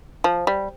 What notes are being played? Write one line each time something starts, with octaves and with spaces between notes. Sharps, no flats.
F3
G3